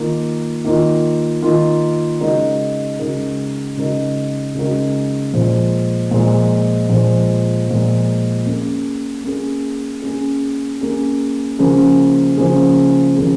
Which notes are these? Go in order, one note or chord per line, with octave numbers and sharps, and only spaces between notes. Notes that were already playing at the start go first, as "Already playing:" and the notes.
Already playing: D#3 A#3 F4
D#3 A#3 F4
D#3 A#3 F4
C#3 G#3 D#4 F#4 A#4
C#3 G#3 D#4 F#4 A#4
C#3 G#3 D#4 F#4 A#4
C#3 G#3 D#4 F#4 A#4
A#2 F3 G#3
A#2 F3 G#3
A#2 F3 G#3
A#2 F3 G#3
A#3 C#4 G#4
A#3 C#4 G#4
A#3 C#4 G#4
A#3 C#4 G#4
C#3 F3 A#3 C#4 G#4
C#3 F3 A#3 C#4 G#4
C#3 F3 A#3 C#4 G#4